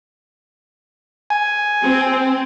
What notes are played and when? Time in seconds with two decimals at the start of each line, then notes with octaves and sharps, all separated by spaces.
1.30 G#5
1.84 C4